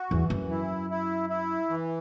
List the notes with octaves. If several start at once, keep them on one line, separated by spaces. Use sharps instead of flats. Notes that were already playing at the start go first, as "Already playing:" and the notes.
Already playing: F#4
E2 E3
F#2
E4
E4
E4
E3